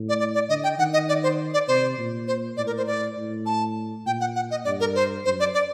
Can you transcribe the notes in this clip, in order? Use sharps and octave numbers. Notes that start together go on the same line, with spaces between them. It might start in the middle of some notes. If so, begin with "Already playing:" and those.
Already playing: A2
D5
D5
D5
D3 D#5
G5
D#3 F#5
D#5
D5
C5
D5
C3 C5
A#2
C5
A2 D5
A#4
C5
D5
A2
A5
A#2 G5
F#5
F#5
D#5
G2 D5
A#4
C5
F#2 C5
D5
D5